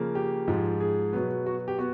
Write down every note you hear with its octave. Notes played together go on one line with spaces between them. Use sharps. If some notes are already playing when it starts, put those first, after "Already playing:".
Already playing: C#3 F3 A#3
G4
G#2 F3 G#3
G#4
B2 F#3 B3
F#4
G4
B3 F#4